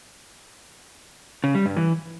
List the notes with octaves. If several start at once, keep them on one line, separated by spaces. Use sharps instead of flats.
C#3
G3
G2
E3